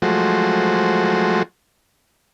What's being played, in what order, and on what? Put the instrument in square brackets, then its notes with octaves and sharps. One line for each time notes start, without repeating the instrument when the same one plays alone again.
[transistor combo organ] F3 F#3 G#3 A3 F#4 C5